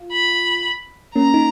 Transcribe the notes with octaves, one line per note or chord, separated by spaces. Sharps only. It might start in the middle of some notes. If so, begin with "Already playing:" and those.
Already playing: F4
B5
A#3 C#4 A#5
D#4